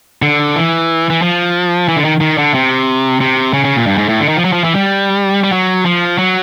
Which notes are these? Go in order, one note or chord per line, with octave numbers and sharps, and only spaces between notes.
D3
E3
E3
F3
E3
D3
D#3
D#3
D3
C3
C3
C#3
C#3
A#2
G2
G#2
A2
D3
D#3
F3
F#3
F3
E3
G3
G3
F#3
F3
F#3